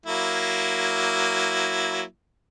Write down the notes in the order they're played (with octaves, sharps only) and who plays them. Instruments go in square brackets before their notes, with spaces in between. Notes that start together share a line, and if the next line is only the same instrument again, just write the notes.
[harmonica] F#3 A#3 E4